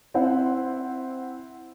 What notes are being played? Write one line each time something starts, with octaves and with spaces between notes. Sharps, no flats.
C4 E4 C5 F#5